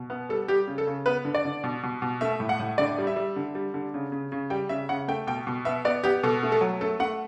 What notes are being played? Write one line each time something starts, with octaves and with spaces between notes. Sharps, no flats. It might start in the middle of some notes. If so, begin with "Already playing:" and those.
Already playing: B2
B3
G3 A4
G3 G4
C#3
A4
C#3
B3 B4
D3
D5
D3
B2
B2
B2
A3 E5
A2
F#5
A2
D3 D5
G3
E5
G3
D3
G3
D3
C#3
C#3
C#3
G3 G5
C#3 E5
C#3 F#5
A3 G5
B2 G5
B2
B3 E5
B3 D5
B3 G4
B2 A4
A3
A4
F#3
A3 A4
A3 F#5